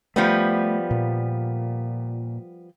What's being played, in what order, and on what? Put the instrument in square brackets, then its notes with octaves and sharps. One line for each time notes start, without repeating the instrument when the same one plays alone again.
[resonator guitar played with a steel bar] F3 G3 B3 [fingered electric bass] A3
[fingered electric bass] A#2